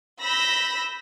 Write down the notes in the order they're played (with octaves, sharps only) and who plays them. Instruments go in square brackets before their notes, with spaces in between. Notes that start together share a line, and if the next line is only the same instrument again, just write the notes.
[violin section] B5 E6 G6 A#6 B6